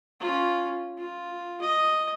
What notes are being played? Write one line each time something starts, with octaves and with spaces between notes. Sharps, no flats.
C#4 F4
F4
D#5